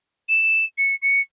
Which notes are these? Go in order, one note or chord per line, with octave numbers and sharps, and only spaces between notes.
E7
C#7
C#7